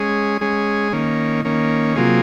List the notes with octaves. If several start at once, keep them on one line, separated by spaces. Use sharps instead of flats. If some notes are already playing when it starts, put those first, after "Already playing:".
Already playing: G#3 C#4 G#4
G#3 C#4 G#4
D#3 A#3 C#4
D#3 A#3 C#4
C3 F#3 A#3 F4 G#4